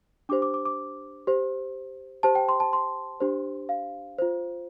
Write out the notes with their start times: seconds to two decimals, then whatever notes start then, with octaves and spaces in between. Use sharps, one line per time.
0.29 D4 G4 C5 D6
0.42 D6
0.54 D6
0.65 D6
1.27 G4 C5
2.23 G4 C5 A5
2.35 G5
2.49 C6
2.60 A5
2.73 C6
3.20 D4 G4 C5
3.69 F5
4.18 F4 C5